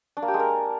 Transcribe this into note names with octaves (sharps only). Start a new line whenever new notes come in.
D4
A#3
G4
G#3
A#4